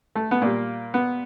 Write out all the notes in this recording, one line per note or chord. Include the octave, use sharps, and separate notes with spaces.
A3
B3
A#2 G3 A#3
B3